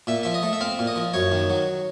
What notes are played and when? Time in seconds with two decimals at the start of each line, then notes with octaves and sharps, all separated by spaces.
0.07 A#2 E5
0.23 F3 E5
0.34 D#5
0.43 A3
0.53 E5
0.61 C4 F5
0.79 A#2
0.87 D#5
0.96 F3
1.14 F#2 C#5
1.32 D#3
1.50 F#3